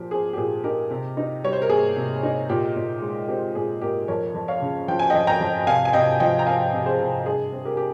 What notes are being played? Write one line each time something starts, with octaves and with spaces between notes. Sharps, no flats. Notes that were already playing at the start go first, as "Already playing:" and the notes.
Already playing: A#2 F3 G4
C4 G#4
G4
A#2 G#4
D#4 G4 A#4
C3
D#4
G3 C#5
C5
A#4
A#3 G#4
C3
D#4
A#2 G4
A#2
G#3
C4 G4
A#2 G#4
A#2 G4 A#4
F2 A#4 C#5
F2
C#5 F5
C#3
F3 G5
G#5
F2 D#5 G5
G5 A#5
F2
C3 F5 G#5
G#5
C3 D#5 G5
F3 D#5 G5
A#5
C4 F5 G#5
C3
G#4 C5
C3
G2 G#4
C4
G4 A#4
G4